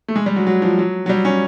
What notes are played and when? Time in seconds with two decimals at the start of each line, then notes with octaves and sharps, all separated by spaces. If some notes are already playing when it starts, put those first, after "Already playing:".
0.08 A3
0.16 G#3
0.26 G3
0.36 F#3
0.47 F#3
0.62 F3
0.79 F#3
1.06 F#3
1.09 G3
1.25 C#4